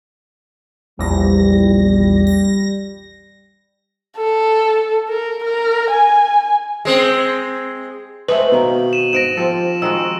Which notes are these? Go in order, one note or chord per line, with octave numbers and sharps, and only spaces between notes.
A#1 E2 G3 A#6
A#6
A4
A#4
A#4
G#5
G#3 C4
G#3 A3 C4 B4 F#7
B2 D#3 A#3
D#7 E7
G#2 A#6 D7 E7
F3 C4 G4 A4
D#3 G#3 F#4 E6